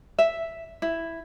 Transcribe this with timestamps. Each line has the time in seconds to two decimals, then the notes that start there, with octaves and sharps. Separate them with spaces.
0.18 E5
0.82 E4